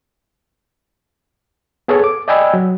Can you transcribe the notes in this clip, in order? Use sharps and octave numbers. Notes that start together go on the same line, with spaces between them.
B3 G#4 A4 C#5
D6
D5 D#5 G5 G#5 B5 E6
F#3